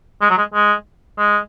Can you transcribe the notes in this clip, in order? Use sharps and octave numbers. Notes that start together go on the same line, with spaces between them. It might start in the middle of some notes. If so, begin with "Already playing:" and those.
G#3
F#3
G#3
G#3
G#3